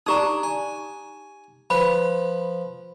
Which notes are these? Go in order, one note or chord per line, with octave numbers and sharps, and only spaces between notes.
D4 D#4 G4 A#5 D#6
G#5
F3 B4 B5